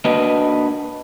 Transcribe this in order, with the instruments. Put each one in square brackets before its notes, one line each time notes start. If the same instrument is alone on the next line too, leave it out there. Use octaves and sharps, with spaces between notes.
[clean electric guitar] A#3 D4 F#4 B4 D#5